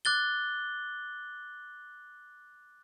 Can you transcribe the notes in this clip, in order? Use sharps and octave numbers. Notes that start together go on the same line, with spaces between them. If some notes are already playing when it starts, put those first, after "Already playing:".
D6 F#6 A6 G7